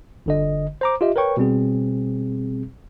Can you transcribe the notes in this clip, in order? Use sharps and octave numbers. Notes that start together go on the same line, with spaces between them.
G1 D3 D#5
C5 A#5 D6
F4 G4 D#5 E5
A#4 B4 C#5 G5 C#6
B2 G3 C4 G#4